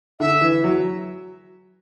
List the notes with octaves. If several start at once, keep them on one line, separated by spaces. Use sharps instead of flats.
D3 E5
E3
F#3